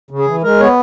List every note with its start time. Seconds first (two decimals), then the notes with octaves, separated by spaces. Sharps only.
0.11 C#3
0.19 G#4
0.27 E3
0.43 G#3 A#4
0.60 B3 C#5